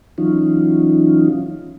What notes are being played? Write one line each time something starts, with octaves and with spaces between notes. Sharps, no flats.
E3 F#3 C#4 D#4 F4